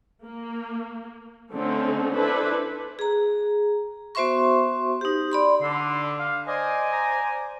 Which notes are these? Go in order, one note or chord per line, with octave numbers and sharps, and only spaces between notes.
A#3
D3 A3 C4 C#4 D#4 A4
D4 E4 A4 B4 C5
G#4 A#5
B3 F#4 C5 E5 C6 C#6
D#4 G4
D5 B5 C6
D3 C6
F5
C5 D5 D#5 G#5
A#5